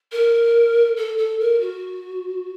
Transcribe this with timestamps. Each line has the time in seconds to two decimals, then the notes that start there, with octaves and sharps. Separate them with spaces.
0.12 A#4
0.97 A4
1.17 A4
1.39 A#4
1.60 F#4